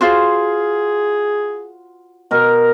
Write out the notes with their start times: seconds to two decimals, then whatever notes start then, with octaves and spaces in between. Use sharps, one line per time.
0.01 F4 F#4 G#4 C5
2.31 B2 A#4